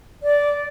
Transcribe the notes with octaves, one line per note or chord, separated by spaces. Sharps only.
D5